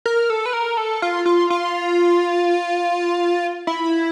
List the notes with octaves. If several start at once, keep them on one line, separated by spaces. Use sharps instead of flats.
A#4
A4
B4
A#4
A4
F4
F4
F4
E4